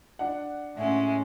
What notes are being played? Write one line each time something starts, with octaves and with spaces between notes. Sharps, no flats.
D4 F#5
A2 G#3 C#4 E5